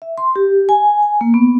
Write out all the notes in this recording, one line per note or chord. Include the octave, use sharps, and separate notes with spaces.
E5
C6
G4
G#5
G#5
A#3
B3